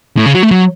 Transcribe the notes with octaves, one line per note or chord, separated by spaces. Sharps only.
A2
C#3
F#3
A3
F#3